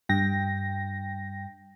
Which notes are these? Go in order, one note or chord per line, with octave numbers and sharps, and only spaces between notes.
G2 G5 A#6